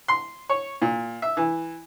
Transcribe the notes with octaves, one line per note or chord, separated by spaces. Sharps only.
C6
C#5
A#2
E5
E3